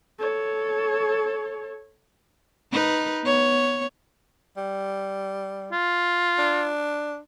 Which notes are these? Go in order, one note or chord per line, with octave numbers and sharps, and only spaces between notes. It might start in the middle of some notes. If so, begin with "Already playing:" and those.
A4 C#5
D#4 B4
B3 C#5
G3
F4
D4